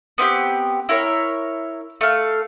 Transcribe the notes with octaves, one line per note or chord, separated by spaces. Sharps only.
B3 C4 E4 G4
E4 A#4 C#5
A3 F5